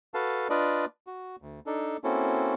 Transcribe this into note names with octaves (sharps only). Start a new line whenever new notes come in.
F#4 A4 B4 F5 A5
D4 F4 B4 D5 D#5
F#4
D2
D4 D#4 A4
A#3 C4 C#4 E4 F#4 A4